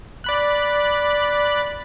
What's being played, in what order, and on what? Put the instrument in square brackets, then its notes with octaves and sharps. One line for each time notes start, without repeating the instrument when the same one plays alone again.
[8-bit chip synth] D5 B5 F#6